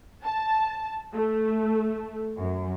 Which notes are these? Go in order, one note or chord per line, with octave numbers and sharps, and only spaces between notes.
A5
A3
F#2